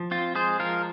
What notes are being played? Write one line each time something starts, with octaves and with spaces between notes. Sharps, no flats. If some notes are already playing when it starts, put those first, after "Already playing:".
Already playing: F3
C4 F4
G#3 G#4 C5
F3 F4 A#4